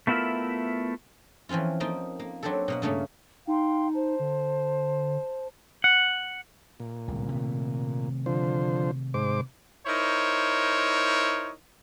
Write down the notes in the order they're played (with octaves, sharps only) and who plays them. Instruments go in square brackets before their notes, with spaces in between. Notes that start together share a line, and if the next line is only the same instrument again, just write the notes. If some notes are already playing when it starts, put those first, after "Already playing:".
[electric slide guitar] A3 B3 E4 F4 A#4 E5
[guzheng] E3 F3 C4 C#4 F4
F3 A#3 D#4 G5
A#3
F#3 C4 D4 G4 A4
B2 A#3 F#5
G2 C#3 A3 A#3 C#4
[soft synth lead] D#4 [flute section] F5 G5 C6
[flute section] C5 A5
[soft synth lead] D3
[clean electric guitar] F#5
[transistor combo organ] A#2
[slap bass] D1 C2
C3 D#3 A3
[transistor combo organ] D3 F3 C5
G#2 C5 D6
[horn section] D#4 E4 A#4 C5 C#5